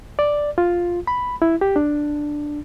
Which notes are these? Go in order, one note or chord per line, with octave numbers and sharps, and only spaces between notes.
D5
F4
B5
E4
G4
D4